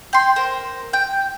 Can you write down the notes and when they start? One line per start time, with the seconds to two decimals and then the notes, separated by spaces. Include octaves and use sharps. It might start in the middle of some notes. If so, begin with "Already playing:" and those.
0.13 G5 C6
0.36 A#4 C5
0.93 G5